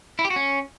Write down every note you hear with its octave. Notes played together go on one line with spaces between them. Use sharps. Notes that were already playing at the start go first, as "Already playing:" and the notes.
E4
G4
F#4
C#4